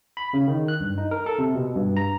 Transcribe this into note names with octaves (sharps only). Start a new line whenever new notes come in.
B5
C#3
D#3
F#6
G2
D#4
A#4
A4
C3
B2
G2
A#5